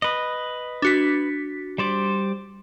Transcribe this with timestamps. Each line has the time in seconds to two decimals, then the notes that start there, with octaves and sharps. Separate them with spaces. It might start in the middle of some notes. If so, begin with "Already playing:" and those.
0.02 B4 D#5
0.82 D4 F#4 B6
1.78 G3 C5 D5